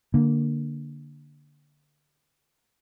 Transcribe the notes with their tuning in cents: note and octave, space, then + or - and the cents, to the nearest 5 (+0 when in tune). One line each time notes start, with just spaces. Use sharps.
D3 +0 A#3 +0